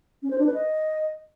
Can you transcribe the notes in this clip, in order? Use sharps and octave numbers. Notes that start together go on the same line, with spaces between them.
C#4
C5
D4
B4
D#5